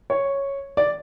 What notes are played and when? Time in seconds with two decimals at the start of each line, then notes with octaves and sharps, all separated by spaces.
0.10 C#5
0.77 D5